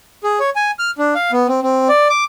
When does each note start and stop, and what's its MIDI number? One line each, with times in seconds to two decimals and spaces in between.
0.24 0.39 68
0.40 0.50 73
0.56 0.71 80
0.79 0.91 89
0.98 1.14 62
1.15 1.31 77
1.32 1.47 59
1.48 1.60 60
1.63 1.88 60
1.89 2.08 74
2.10 2.24 86